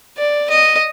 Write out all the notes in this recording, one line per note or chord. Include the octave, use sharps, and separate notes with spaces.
D5
D#5